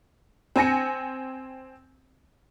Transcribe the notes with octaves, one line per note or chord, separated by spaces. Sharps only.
C4 G#5 A#6 C#7